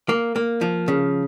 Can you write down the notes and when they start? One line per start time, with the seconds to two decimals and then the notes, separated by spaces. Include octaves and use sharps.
0.09 A#3
0.36 A#3
0.61 F3
0.88 C#3